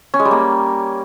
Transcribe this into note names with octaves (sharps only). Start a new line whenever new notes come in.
C#4
G#3
G3
A#3